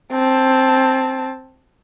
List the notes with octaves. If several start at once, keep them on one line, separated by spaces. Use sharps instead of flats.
C4 A5